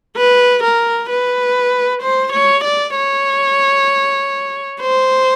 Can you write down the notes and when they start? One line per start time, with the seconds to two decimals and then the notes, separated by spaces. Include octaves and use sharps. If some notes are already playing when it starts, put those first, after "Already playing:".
0.17 B4
0.64 A#4
1.10 B4
2.02 C5
2.33 C#5
2.64 D5
2.96 C#5
4.81 C5